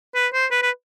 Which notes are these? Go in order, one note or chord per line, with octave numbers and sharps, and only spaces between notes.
B4
C5
B4
B4